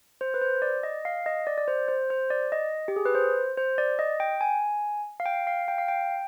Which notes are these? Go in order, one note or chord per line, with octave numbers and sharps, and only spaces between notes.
C5
B4
C5
D5
D#5
F5
D#5
D5
D5
C5
C5
C5
D5
D#5
G4
G#4
B4
C5
C5
D5
D#5
G5
G#5
F5
G5
F5
G5
F5
G5